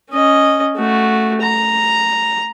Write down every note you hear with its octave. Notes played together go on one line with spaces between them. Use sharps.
C#4 D#5
A3 F#4
A#5